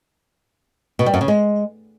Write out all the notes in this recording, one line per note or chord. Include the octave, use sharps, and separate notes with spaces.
B2
G3
F#2
C#3
G#3